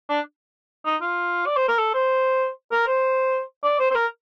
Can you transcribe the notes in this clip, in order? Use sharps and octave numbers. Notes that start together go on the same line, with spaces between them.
D4
D#4
F4
D5
C5
A#4
A4
C5
A#4
C5
D5
C5
C5
A#4